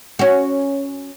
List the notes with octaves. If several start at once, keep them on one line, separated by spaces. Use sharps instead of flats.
C#4 F#4